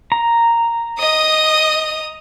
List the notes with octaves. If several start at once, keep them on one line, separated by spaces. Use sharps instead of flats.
A#5
D#5 D#6